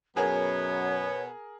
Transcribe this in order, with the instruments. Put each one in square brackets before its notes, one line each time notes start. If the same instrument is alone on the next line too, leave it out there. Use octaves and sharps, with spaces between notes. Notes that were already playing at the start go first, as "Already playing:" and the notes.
[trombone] F#2 [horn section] B2 B3 [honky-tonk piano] G#4 A#4 [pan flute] C#5